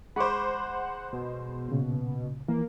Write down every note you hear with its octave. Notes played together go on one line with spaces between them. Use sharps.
G#3 C5 F#5 B5 C#6 D6
B2
A#2 C#3
E3 A#3